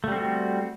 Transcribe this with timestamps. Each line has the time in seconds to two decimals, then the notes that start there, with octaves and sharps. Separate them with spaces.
0.04 A3
0.08 G3
0.12 C4
0.16 F#4